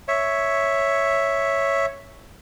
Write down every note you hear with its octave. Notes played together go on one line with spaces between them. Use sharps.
C#5 E5